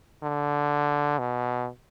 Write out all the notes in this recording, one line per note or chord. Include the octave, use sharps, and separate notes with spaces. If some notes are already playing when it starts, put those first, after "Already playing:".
D3
B2